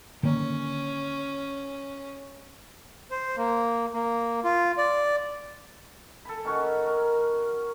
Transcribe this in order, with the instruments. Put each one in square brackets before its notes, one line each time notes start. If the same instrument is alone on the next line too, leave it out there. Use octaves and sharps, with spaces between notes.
[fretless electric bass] D3 D#3 A#3 [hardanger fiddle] C#4
[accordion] C5
A#3
A#3
F4
D5
[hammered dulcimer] A4 G#5 B5
D#3 C#4 F#4
A#4